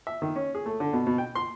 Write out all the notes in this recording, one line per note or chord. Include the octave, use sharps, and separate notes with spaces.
E5
D#3
C#4
G#4
A3
D3
B2
B2
G5
C6